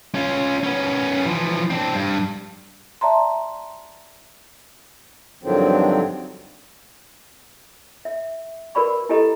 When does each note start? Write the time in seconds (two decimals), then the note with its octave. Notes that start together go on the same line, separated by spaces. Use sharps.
0.15 C#4 F4
0.64 B3 C#4
1.26 E3 F3
1.71 C4 D4
1.95 G2
3.01 D5 E5 A5 A#5 C6
5.43 G2 D3 D#3 F3 F#3 C4
8.05 E5
8.75 F#4 A#4 B4 D5 B5 C#6
9.09 E4 G4 A4 D#5 A#5